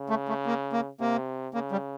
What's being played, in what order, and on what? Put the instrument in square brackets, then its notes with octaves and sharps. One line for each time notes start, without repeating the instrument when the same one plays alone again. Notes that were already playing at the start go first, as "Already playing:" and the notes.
Already playing: [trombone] C#3
[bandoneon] A3
A3
A#3
A#3
[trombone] C3 [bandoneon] A#3
[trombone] C#3 [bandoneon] A#3
[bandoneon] G3